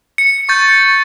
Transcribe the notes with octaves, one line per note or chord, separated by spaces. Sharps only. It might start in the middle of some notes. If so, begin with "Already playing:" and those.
C#7
C#6 G6 A6